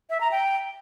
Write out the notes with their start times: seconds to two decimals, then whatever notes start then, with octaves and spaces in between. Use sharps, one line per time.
0.10 E5
0.21 A#5
0.31 G5